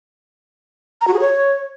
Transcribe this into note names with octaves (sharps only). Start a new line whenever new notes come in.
A#5
F#4
G#4
C#5